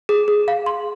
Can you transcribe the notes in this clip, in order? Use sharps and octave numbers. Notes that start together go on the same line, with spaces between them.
G#4
G#4
F5
C6